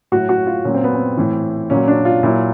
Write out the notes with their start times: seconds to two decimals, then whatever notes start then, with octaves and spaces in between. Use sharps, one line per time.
0.12 A2 F#3 F#4
0.29 F#4
0.47 F4
0.65 A#2 F#3 C#4
0.74 C4
0.84 B3
0.95 C4
1.17 A2 E3
1.70 A#2 F#3 C#4
1.88 D4
2.05 F4
2.23 A#2 F#3 E4